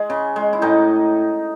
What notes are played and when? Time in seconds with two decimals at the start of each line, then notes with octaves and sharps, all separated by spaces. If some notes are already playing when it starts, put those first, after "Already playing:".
Already playing: G#3
0.10 C#3
0.36 G#3
0.53 E4
0.62 A2 D#4